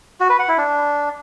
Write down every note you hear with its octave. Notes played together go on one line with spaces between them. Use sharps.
F#4
B4
F#5
E4
D4